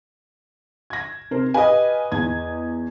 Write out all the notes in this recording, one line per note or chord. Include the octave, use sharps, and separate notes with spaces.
G#6 A#6
C3 A#4 C5
G4 B4 D#5 F5 G#5
E2 G#6